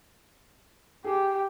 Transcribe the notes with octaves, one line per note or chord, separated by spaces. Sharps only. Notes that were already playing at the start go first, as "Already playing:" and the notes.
G4 G#4